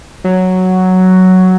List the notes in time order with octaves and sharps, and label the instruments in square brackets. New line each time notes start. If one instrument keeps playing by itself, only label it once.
[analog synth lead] F#3